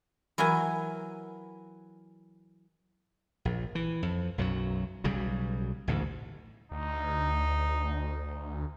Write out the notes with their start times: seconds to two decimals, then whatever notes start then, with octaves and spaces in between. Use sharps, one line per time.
0.38 E3 F#3 E4 A#4 G#5
3.45 A#1
3.75 E3
4.03 F2
4.38 B1 F#2 F3 F#3
5.04 B1 C#3 F#3 G3
5.88 A1 D2 G#2
6.72 D2 D#4